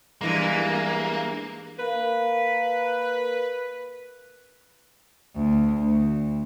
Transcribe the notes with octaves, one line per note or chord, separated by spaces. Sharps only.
G2 E3 G#3 A#3
A#3 B4
D2
D2